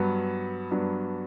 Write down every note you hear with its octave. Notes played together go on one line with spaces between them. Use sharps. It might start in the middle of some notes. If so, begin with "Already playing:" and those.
Already playing: G2 F#3 B3
G2 F#3 B3 D4